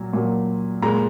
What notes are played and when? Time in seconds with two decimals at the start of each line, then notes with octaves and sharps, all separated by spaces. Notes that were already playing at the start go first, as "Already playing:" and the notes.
Already playing: A#2 F#3
0.13 A#2 F#3
0.82 A#2 G#3 A#5